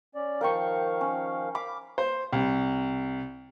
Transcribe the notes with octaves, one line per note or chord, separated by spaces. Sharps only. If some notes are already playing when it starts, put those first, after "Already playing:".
C#4 D5
D#3 F3 A#4 F5 G5 C#6
C#4
F5 B5 D6
C5
C2